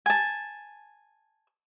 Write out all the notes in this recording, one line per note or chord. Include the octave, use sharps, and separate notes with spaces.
G#5 A5